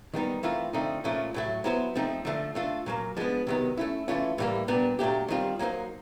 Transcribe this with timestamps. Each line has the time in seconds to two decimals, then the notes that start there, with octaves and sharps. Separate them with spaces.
0.14 D#3 G3 B3 D#4
0.43 E3 A3 C4 F4 A#4
0.73 D3 F3 A3 C4 D#4
1.04 A#2 F3 A3 C#4
1.34 A2 F#3 A3
1.64 F#3 B3 E4 A4 C5
1.95 F3 A3 C4 D#4
2.25 D3 F3 A3 D4
2.55 A3 D4 F4 A4
2.86 A#2 F#3 A#3
3.17 F3 G#3 B3 D4
3.47 C3 D#3 F#3 B3
3.77 A3 C#4 E4
4.08 E3 A3 C#4 F4
4.38 A2 E3 G3 A#3
4.68 A#2 G3 B3 D4
4.99 A#2 F#3 A3 D4 G4
5.28 D#3 G3 C4 F4
5.59 F#3 A#3 D#4 G4 C5